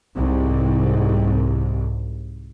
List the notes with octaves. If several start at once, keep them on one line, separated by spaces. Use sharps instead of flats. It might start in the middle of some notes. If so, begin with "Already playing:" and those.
C2 G#2